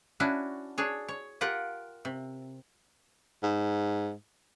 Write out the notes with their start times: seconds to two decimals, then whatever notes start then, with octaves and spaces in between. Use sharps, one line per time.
0.20 C#4 D4 E4 F#4
0.78 D4 G#4 C#5
1.08 C#5
1.41 F4 G4 A#4 F#5
2.05 C3
3.43 G#2